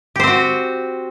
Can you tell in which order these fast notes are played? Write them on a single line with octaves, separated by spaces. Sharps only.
G4 C5 C4 F#4